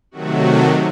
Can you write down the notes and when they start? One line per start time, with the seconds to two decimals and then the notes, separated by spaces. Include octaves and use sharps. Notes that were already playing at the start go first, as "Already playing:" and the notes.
0.11 C3 D#3 F#3 A3 F#4